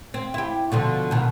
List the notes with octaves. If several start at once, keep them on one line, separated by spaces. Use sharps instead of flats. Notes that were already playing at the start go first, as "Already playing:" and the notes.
C4
E4 G4
B2 D3 F3
B2 D#3